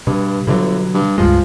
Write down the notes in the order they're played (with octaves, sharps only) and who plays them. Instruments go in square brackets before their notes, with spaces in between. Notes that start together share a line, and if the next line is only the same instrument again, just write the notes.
[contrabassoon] G2 [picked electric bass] B2
[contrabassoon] G1 [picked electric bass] B2 D3 F#3
[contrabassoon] G2
[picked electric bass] C#2 G2 G#3 [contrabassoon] F3